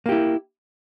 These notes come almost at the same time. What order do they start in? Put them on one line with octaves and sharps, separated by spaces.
A#3 G4 E4